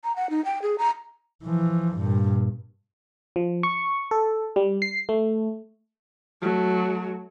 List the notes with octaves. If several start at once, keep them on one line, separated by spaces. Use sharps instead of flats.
A#5
F#5
D#4
G5
G#4
A#5
E3 F3
G2 A#2
F3
C#6
A4
G3
C7
A3
F#3 A3